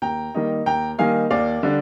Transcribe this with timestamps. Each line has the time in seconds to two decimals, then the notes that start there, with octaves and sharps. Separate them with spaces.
0.02 D#2 G5 A#5
0.35 D#3 G3 A#3 D#4
0.66 D#2 G5 A#5
0.98 D#3 G3 A#3 D#4 F5 G#5
1.30 D#2 D5 F5
1.63 D3 G3 D4